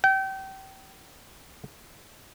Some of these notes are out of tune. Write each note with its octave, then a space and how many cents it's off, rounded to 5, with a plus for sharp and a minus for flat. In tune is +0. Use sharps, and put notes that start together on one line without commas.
G5 -30